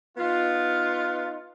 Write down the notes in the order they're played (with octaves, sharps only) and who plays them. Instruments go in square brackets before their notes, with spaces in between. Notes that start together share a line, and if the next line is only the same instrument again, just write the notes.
[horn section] B3 D#4 F4